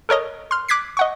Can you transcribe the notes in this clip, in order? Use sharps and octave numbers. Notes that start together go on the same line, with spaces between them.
A4 A#4 C#5 D#5
C6 F6
D6 F#6 G#6 B6 C7
D#5 F#5 C#6